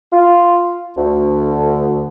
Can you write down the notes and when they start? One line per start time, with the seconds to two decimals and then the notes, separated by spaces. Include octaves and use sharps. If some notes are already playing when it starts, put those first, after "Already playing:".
0.13 F4
0.97 D2